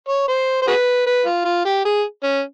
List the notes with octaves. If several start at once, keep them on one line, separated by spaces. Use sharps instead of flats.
C#5
C5
C5
F#4 G#4 B4
B4
F4
F4
G4
G#4
C#4